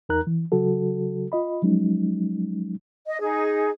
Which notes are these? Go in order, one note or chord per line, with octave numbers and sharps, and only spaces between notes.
E2 D#4 A#4 A#5 F#6
E3
C#3 F#3 F#4 A4
F4 D#5 B5
F3 F#3 G#3 C#4 D#4
D#5
D#4 G#4